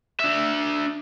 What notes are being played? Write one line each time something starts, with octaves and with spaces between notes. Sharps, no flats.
D4 E5